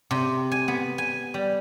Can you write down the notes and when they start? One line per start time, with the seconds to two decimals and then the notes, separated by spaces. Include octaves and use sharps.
0.11 C3
0.52 G#5
0.68 B3
0.98 G#5
1.34 G3